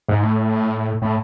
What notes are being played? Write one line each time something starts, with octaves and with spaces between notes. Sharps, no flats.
G#2
A2
A2